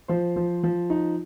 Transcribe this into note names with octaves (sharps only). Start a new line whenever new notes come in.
F3 C5
F3
F3
D#4